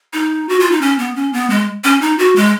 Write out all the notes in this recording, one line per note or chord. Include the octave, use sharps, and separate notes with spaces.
D#4
F#4
F4
D#4
C#4
B3
C#4
B3
G#3
C#4
D#4
F#4
G#3